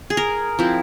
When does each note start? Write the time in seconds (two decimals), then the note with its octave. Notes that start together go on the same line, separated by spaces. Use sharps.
0.10 G#4
0.17 A#4
0.59 F3 C4 E4